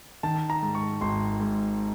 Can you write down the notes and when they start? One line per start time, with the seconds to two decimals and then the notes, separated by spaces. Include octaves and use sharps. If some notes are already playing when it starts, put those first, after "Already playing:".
0.23 D#3 A5
0.50 A#5
0.62 G#2
0.75 C#6
1.01 G#1 C6
1.40 G#2